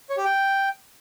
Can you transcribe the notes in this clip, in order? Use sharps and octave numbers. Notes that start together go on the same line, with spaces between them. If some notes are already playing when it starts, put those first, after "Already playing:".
C#5
G4
G5